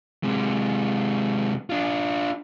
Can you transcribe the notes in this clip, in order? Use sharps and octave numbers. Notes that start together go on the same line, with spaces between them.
C3 G#3
D4 F4